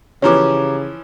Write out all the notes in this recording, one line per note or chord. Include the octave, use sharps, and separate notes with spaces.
C#3 E3 F3 C#4 G4 C#5 A#5 D6